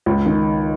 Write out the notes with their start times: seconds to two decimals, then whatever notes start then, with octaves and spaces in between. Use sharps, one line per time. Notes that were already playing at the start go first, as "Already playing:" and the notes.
0.06 C#2
0.26 D#3